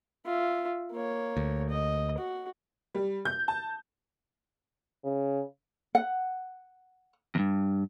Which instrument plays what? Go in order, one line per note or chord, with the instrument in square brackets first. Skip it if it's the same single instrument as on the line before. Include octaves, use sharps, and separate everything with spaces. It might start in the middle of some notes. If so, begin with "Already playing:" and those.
[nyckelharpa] F4 E5
A#3 C#5
[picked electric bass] D2
[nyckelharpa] D#5
F#4
[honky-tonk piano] G3
G6
A5
[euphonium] C#3
[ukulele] F#5
[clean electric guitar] E2 G2